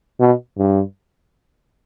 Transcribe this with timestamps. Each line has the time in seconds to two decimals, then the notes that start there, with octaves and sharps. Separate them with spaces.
0.20 B2
0.58 G2